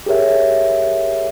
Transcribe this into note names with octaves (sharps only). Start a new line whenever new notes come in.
G4 G#4 A#4 C#5 E5